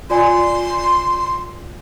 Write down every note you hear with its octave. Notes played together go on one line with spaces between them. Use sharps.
F4 D5 G#5 C6